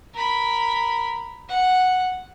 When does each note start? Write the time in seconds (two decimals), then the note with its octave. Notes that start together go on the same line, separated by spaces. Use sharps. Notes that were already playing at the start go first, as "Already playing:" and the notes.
0.14 A#4 B5
1.49 F#5